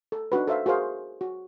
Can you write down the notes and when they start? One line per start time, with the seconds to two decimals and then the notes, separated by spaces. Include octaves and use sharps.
0.12 A4
0.32 D4 D#4 F#4 B4
0.47 A4 C5 E5 F5
0.66 F#4 G#4 A#4 C5 F5
1.21 F#4